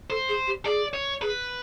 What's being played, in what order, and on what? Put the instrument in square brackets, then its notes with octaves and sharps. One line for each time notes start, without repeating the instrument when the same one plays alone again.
[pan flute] A4 [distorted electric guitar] C5
[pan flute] G#4
G4
[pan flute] G#4 [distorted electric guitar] D5
[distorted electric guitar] C#5
[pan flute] G#4 [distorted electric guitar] B4